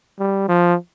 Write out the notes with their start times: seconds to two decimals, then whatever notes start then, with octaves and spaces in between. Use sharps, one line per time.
0.19 G3
0.49 F3